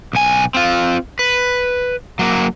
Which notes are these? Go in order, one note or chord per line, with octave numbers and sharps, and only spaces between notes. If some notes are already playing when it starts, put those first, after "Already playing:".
B1 G#5
C4 F4
B4
F#3 A#3